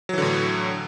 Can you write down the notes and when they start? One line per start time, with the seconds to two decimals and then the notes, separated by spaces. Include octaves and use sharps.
0.09 F#3
0.13 E3
0.18 D3
0.22 A2